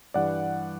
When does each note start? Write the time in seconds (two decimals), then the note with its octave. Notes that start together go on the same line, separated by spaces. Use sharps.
0.14 G2 E3 G3 D5 F#5